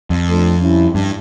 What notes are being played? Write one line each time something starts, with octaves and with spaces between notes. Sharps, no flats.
F2
F3 A3 D4 A4
G3 C#4 E4
G2